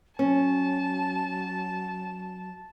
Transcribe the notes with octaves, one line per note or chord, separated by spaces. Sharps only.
F#3 C#4 A5